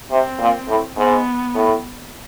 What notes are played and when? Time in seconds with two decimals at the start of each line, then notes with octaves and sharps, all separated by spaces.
0.10 C3 C4
0.39 A#2
0.68 A2
0.96 G#2 B3
1.54 A2